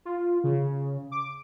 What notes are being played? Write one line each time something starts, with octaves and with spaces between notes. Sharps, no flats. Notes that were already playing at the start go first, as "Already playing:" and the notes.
F4
C#3
D6